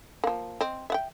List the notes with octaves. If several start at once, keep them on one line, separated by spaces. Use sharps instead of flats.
F3 A#3
C4 D#5
E5 F#5 G5